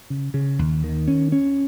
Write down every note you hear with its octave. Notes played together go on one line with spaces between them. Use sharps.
C#3
C#3
D#2
D#3
C#4
C#4